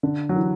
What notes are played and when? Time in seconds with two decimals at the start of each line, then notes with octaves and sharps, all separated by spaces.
0.03 D3
0.29 F#3
0.36 E3